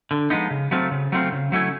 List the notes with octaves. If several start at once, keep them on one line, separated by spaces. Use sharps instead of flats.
D3
F3 G#3 B3 D#4
C#3
F#3 A3 C4 F4
C#3
F#3 A3 C4 F4
C#3
F#3 A3 C#4 E4